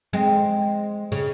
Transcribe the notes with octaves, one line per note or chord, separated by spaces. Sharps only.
G#3 C4
C#3